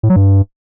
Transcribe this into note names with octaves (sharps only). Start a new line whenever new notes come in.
A2
F#3
G2